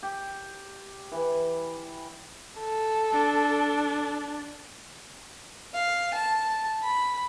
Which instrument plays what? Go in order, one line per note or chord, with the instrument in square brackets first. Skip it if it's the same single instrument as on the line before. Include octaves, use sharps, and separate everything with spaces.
[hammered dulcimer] G4
E3
[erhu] A4
[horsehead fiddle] D4
[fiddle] F5
A5
B5